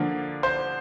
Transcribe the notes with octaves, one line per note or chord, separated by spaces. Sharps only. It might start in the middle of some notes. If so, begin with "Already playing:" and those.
Already playing: D3 F3 A#3 D4
C5